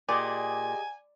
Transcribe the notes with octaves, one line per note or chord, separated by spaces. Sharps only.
A#2 G4 G#4 D5 D#5 G#5